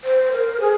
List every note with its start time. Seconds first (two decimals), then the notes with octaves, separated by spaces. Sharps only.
0.04 C5
0.32 A#4
0.60 G#4